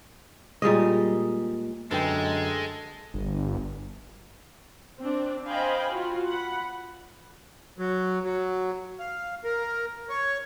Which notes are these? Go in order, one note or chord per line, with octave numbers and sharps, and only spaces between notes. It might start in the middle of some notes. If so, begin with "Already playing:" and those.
A#2 G3 G#3 D#5
F#2 D3 G#3 A4 B4 G5
G1
C4 D4
C5 D#5 F5 G5 G#5 B5
F4 F#4
F#5 B5
F#3
F#3
F5
A#4
C#5